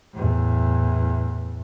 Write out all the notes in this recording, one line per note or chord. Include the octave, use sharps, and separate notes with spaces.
E2 A2